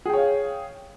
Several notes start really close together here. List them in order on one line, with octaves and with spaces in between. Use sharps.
G#4 G5 C#5 F5